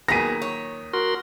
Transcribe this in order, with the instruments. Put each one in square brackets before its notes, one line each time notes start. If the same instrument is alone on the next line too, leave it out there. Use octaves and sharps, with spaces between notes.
[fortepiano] A#2 D#3 F#3 [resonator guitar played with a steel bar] B3 G#4 [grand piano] A#6 B6 D#7
[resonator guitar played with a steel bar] C#5
[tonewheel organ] F#4 A#4 C6